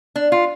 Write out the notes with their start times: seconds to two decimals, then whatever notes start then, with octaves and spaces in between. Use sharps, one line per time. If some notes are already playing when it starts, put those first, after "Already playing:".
0.16 D4
0.32 F4